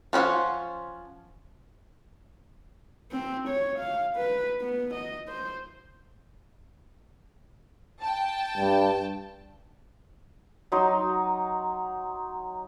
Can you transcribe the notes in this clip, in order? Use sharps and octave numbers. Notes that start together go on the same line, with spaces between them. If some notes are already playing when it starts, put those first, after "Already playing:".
F3 C#4 F#4 C5 F#5
C4
C#5
F5
B4
B3
D#5
C5
G5 A5
G2
F#3 D#4 C6